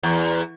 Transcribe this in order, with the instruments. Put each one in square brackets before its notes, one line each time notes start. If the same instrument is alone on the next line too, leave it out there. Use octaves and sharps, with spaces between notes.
[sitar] E2